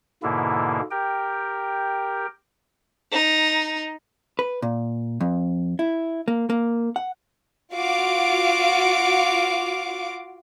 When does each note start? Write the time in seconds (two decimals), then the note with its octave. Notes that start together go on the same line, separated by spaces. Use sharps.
0.23 G#2 B2 D3 A#3 E4
0.91 G4 A#4 G5
3.12 D#4
4.39 B4
4.62 A#2
5.21 F2
5.79 E4
6.28 A#3
6.50 A#3
6.96 F#5
7.74 F4 F#4 F5 D6